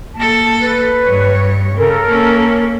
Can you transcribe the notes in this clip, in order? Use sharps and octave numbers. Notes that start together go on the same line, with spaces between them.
A#3 A4 A5
B4
G2 C#5
C#3 A4 A#4
A#3 C#4